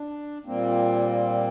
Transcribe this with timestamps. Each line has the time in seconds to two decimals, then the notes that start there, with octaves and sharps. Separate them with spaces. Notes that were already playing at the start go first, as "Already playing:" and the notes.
Already playing: D4
0.46 A#2 G3 A#3 C4